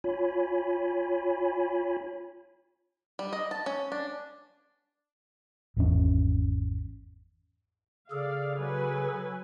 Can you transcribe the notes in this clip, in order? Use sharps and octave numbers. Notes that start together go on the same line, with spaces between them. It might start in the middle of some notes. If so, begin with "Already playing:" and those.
F4 C#5 G#5 B5
G3
D#5
A5
C#4
D4
G#1 E2 C#4
C#3 G#4 A4 D5 F5
F#3 B4 G#5